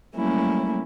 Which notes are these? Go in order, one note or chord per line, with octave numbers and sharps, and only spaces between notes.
F#3 G3 A3 A#3 C#4 E4